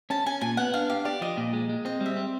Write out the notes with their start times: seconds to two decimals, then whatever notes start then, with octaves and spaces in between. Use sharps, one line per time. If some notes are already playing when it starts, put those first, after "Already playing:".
0.10 C#4 A5
0.26 C#4 G#5
0.41 A#2 G#5
0.57 B3 F#5
0.74 D4 F5
0.90 G4 F5
1.05 G4 D5
1.21 F3 D#5
1.37 A#2
1.53 G#3
1.69 G#3
1.85 C4 D#5
2.01 G3 E5
2.17 C4